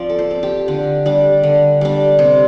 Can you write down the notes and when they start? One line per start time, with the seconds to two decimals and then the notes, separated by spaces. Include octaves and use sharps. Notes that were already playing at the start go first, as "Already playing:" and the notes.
Already playing: F3 C4 D5
0.09 A4
0.19 C5
0.31 C4
0.43 G4
0.68 D3
1.06 G3 D4
1.43 D3
1.81 G3 D4
2.19 C3 C5